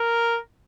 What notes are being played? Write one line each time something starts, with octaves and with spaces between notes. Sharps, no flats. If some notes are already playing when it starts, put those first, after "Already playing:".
Already playing: A#4